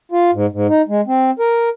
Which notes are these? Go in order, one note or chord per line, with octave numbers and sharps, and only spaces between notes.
F4
G#2
G#2
D#4
G#3
C4
A#4